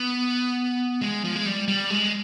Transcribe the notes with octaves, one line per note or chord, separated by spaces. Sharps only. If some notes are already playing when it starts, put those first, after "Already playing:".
Already playing: B3
G#3
F3
G#3
G3
G3
G#3